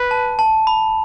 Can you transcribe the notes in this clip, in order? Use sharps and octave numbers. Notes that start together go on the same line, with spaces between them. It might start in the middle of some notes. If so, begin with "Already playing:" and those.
Already playing: B4
A5
A5
B5